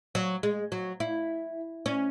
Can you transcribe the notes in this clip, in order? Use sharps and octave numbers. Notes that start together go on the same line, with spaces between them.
F#3
G#3
F#3
E4
C#4